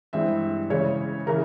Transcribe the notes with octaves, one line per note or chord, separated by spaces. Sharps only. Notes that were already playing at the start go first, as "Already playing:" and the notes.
G2 E3 G#3 C4 E4 E5
C#3 E3 G#3 E4 C#5
C#3 E3 A#4